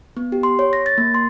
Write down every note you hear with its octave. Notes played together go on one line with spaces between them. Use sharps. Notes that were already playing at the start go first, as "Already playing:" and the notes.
B3
G4
C6
C#5
A#6
A6
A#3
C6